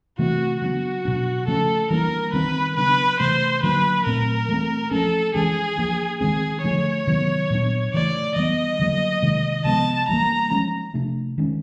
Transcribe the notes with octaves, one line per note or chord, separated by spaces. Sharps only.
C3 E3 A3 C4 F#4
C#3 F#3 B3 D4 F#4
B2 F#3 B3 D4
C#3 F3 A3 C#4 A4
E3 G3 A#3 D4 A#4
D#3 G3 C4 B4
C#3 F#3 B3 D4 B4
C3 E3 A3 C5
D3 F#3 A#3 D4 B4
A#2 F#3 A3 C4 A#4
E3 A3 C4
F3 A3 C#4 A4
E3 G#3 C#4 G#4
F3 A#3 D4
D#3 G#3 C4 G#4
D3 F3 A3 C#5
C3 D#3 F#3 B3
A#2 F#3 B3 D4
C#3 E3 A3 D5
E3 G3 B3 D#5
D3 F#3 A#3
C3 D#3 G#3
C3 F3 G#3 B3 A5
E3 G3 A#3 A#5
F3 G#3 C#4
C3 F3 A3 D4
D#3 G#3 C#4